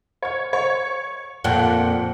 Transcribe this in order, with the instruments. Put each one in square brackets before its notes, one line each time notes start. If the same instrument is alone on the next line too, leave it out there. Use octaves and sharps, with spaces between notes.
[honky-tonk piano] C#5 G#6
C#5
[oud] F2 A#2 [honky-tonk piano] F#5 G5